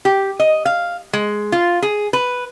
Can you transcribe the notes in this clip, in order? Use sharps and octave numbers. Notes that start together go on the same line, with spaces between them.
G4
D#5
F5
G#3
F4
G#4
B4